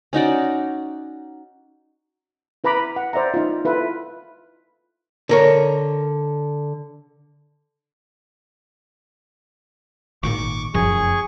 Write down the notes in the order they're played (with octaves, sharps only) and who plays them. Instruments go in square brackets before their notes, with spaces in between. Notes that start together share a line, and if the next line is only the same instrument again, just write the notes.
[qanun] C#4 D#4 F#4 D5
[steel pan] E4 B4 A#5 B5 D6
F#5
C5 D5 E5 A#5
D#4 F4
E4 F4 A4 B4 E5
[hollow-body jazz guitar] D3 A#4 C#5
[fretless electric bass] G#1 A#2 D#3 [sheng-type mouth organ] C#6 D6
[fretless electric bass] F1 F#2 F3 [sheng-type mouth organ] G#4 C#6